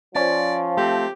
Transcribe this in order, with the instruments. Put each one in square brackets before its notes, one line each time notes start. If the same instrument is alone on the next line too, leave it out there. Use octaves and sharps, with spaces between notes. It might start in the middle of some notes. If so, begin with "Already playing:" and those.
[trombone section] F3 [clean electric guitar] C#4 [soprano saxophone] D5
[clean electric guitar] A3 C4 [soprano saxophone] G4